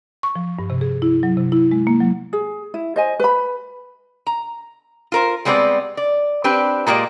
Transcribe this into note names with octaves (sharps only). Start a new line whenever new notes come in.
C#6
F3
G2
C3
G#4
E4
F#3
C3
E4
G#3
A#3
F#3
G#4
E4
C5 D#5 G#5
B4 B5
A#5
F4 A#4 C5
G3 G#3 B3 C4 C#5 D5
D5
C4 D4 G4 B4
A#2 G#3 A#3 G4 D5